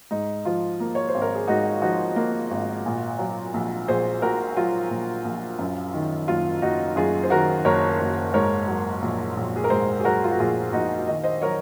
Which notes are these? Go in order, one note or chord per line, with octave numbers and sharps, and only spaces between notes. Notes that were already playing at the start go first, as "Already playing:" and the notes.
G#2 D#4
F3 F4
A#3
C#5
C5
G#1
A#4
G#4
G#2 D#4 F#4
F3 D#4 F#4
A#3
G#1
A#2
F#3
A#1
A#1 G#4 C5
A#2 F#4 A#4
F#3 F4
A#1
A#1
F#2
D#3
F#1 F4
F#1 D#4 F#4
F#2 F4 G#4
C5
D#3 F#4 A#4
F#1 A#4 C#5
F#1
G#2 A#4 C#5
F#3
A#1
A#1
G#4
A#4
G#2 G#4 C5
G#4
F#3 F#4 A#4
F4
F#4
A#1 F4 G#4
A#1 D#4 F#4
D#3 D#5
C5 D#5
F#3 A#4 C#5